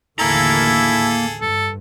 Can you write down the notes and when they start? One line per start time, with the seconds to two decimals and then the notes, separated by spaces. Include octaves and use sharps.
0.20 A1 D#2 D3 A#3 E4 G#4 A4 A#5
1.41 G2 A4